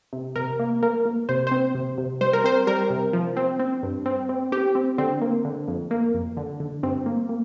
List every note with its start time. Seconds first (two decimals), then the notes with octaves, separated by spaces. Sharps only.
0.13 C3
0.36 C3 A#4
0.59 A#3
0.82 A#3 A#4
1.05 A#3
1.29 C3 C5
1.47 C4 C5
1.75 C3
1.98 C3
2.21 G3 C5
2.33 A#4
2.44 C4 C5
2.67 G3 A#4
2.90 C3
3.13 F3
3.37 C4
3.60 C4
3.83 G2
4.06 C4
4.29 C4
4.52 C4 G4
4.75 C4
4.98 D3 C4
5.22 A#3
5.45 D3
5.68 F2
5.91 A#3
6.14 F2
6.37 D3
6.60 D3
6.83 G2 C4
7.06 A#3
7.29 A#3